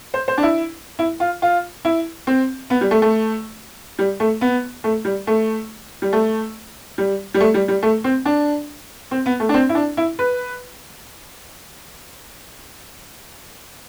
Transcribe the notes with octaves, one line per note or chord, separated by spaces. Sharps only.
C5
C5
D4
E4
E4
F4
F4
E4
C4
B3
G3
A3
A3
G3
A3
B3
A3
G3
A3
G3
A3
G3
G3
A3
G3
G3
A3
C4
D4
C4
B3
A3
D4
C4
E4
D4
E4
B4